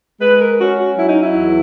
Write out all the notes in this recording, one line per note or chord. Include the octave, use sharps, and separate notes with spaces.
G#3 B4
A#4
C#4 F#4
F#4
F#3 E4
D#4
E4
E2